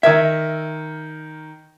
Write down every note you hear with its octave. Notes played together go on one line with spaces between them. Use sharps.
D#3 A#4 E5 G#6